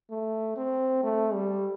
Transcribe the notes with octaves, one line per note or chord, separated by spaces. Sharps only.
A3
C4
A3
G3